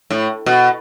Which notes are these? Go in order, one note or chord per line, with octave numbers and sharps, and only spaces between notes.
A2
B2